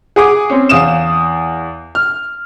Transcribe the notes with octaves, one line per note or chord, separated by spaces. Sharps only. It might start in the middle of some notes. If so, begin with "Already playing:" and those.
G#4 F#5 D6 D#6
C4 C#4
E2 F5 D#6 E7
F6